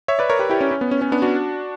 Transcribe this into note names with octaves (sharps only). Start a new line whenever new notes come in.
C#5 E5
B4 D5
A#4 C#5
G4 B4
E4 G4
C#4
C#4
B3
C#4
C#4
B3 D4
D4 F#4